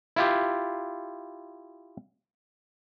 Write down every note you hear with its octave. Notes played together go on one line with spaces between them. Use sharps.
E4 F4 G4